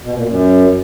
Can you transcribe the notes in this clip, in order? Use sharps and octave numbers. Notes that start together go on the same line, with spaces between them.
B2
A#2
F#2